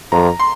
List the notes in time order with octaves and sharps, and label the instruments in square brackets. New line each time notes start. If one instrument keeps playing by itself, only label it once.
[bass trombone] F2 [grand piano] A#5
[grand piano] C6